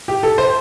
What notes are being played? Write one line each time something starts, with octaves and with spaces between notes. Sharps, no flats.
G4
A4
C5